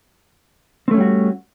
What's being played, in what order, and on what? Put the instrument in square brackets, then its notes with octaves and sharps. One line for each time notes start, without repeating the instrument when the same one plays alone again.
[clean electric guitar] C4
A3
C#4
G3
F#4